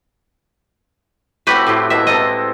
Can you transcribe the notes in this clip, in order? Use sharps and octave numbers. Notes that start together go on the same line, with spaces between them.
A2 C4 F#4 G4 B4
A2 E4 G4 C5
B2 A#3 C5 E5
G#3 C4 A4 D#5